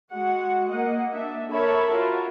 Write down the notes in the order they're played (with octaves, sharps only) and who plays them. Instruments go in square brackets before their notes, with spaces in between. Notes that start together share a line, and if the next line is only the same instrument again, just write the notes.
[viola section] G#3 F#4 F#5
A#3 D#5 F#5
D4 E5
A4 A#4 C#5 E5 A5 B5
F4 F#4 A#4